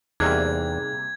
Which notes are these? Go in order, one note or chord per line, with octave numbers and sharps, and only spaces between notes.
E2 C3 G3 A#3 D#4 G#4 F#6 G#6